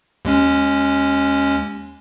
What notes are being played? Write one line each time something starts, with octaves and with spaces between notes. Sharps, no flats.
D#2 G#3 C#4